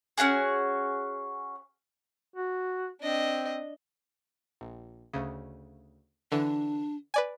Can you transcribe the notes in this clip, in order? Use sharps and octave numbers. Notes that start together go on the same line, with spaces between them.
C#4 D4 F#4 G#4
F#4
C4 D4 D#5
A#1
D2 C#3
D3 E3 D4
B4 D5 G#5